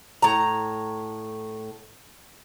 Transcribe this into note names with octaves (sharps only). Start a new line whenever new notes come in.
A2 A#5